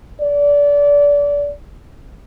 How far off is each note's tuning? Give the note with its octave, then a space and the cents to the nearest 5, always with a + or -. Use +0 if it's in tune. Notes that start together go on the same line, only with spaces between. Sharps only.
D5 -25